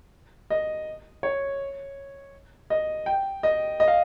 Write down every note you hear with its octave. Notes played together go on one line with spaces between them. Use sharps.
D#5
C#5
D#5
G5
D#5
D#5
F5